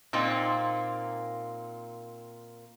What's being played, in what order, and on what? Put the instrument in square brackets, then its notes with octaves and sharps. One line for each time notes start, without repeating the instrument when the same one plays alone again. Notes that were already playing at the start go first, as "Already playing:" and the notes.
[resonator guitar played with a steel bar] A#2 A#3 C4 D#4